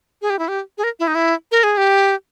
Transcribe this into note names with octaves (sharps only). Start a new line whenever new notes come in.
G#4
G4
E4
G4
G#4
A#4
E4
D#4
E4
A#4
G#4
G4